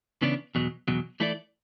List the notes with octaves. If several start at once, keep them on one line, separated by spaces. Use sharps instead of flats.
C#3 E3 B3 D4
E2 B2 F#3
E2 B2 F#3
E3 A3 E4 A4 D5